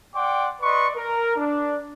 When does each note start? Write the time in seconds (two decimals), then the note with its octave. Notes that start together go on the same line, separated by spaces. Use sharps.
0.14 D5 F#5 G5 C6 D6
0.61 B4 D5 D#5 C6 C#6
0.95 A#4
1.37 D4